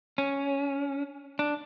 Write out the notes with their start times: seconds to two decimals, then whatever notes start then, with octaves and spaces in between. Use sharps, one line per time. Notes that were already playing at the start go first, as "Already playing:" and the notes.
0.18 C#4
1.39 D4